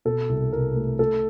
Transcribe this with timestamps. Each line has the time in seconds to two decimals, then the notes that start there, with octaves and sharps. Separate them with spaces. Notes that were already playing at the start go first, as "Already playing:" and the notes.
0.05 B2 A4
0.29 C2
0.52 C2 A#4
0.76 A3
0.99 A3 A4